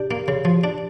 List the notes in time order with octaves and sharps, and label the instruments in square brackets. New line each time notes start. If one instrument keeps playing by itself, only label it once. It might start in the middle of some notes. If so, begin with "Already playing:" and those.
Already playing: [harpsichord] D4 [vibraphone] G4
[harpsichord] A#3
C#3
F3
D4